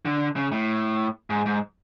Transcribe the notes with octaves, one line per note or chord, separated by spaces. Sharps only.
D3
C#3
A2
G#2
G#2